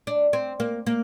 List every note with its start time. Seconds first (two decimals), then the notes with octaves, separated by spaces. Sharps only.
0.07 D4
0.33 C4
0.60 A#3
0.86 A#3